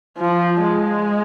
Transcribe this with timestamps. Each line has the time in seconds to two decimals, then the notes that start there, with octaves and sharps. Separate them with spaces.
0.18 F3
0.64 G#3